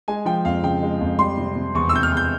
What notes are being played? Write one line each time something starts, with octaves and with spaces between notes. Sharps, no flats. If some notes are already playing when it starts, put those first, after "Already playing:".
G#3 G#5
F3 G5
F2 F5
C#3 G5
G#3
F2
G3 C6
C3
C3
E2 C#6
E6
C3 G6
F6
E2
G6